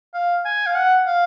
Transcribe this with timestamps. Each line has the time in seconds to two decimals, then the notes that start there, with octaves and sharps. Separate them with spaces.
0.14 F5
0.45 G#5
0.66 F5
0.75 F#5
1.06 F5